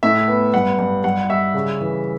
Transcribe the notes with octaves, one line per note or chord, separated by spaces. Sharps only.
A2 E5
B3
G2 F#5
G2
G2 F#5
G3 E5
C#3
E3